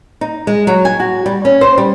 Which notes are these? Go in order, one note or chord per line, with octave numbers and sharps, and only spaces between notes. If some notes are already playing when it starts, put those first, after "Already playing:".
D#4
G#3
F#3
G#5
F#4
G3
C#4
C5
G3